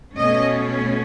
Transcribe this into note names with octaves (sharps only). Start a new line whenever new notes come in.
B2 A3 C#4 D#5